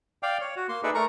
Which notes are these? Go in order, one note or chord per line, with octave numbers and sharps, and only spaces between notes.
D5 F5 G5
C#5
F#4
A#3 C6
D#4 G#4 A4 B4 D5 E5
A3 A#4 A#5 C#6